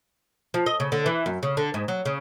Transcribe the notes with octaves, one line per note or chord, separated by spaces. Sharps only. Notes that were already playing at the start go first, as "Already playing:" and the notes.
F3
D#5
C#3
D3
E3
F#2
C#3
D3
G#2
F#3
C#3